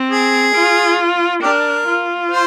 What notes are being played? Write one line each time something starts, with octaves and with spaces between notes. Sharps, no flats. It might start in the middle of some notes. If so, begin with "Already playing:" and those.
Already playing: C4
G#4
F4
D4 G4 A#4
F4
C5